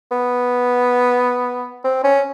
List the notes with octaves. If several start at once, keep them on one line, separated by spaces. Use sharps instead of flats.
B3
C4
C#4